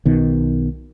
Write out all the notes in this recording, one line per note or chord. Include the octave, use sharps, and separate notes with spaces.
B1 B2 D#3